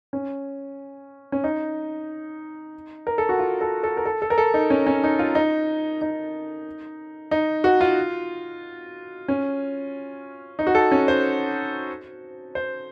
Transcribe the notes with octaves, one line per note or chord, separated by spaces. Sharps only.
C#4
C#4
D#4
A#4
A4
F#4
F4
A4
A4
A#4
A4
A4
A#4
A4
D#4
C#4
C#4
D#4
F4
D#4
D#4
D#4
F#4
F4
C#4
D#4
F#4
A4
C#4
C5
C5